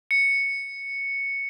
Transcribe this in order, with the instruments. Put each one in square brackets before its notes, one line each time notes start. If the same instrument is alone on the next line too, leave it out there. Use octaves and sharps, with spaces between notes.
[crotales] C#7